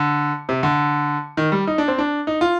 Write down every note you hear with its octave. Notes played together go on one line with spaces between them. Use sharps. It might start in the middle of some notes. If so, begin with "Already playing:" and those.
Already playing: D3
C3
D3
D#3
G3
D#4
D4
C4
D4
D#4
F4